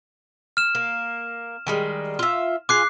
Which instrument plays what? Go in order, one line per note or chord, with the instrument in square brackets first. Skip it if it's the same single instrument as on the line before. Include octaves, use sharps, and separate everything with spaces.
[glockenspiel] F6 E7
[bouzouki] A#3
D#3 G3 G#3
F4 E5
[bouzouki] F4 G#4 [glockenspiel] D6 F#6 C7